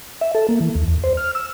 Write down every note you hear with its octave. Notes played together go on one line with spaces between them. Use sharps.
E5
A4
A#3
E3
D#2
E2
C5
F6
E6